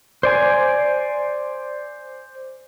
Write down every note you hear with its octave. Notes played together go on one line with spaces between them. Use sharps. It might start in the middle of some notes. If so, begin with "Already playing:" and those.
C5 D5 G#5